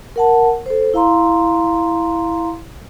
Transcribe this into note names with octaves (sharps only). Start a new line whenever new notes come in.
A#4 F#5 A5
A4 C5
E4 F5 A#5 C6